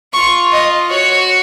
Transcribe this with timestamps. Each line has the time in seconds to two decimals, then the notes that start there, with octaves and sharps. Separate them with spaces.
0.14 F4 C#6
0.53 D#5
0.90 F#4 C#5